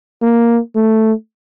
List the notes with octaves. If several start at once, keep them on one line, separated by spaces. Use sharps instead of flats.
A#3
A3